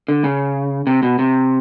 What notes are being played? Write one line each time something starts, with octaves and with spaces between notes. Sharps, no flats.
D3
C#3
C3
B2
C3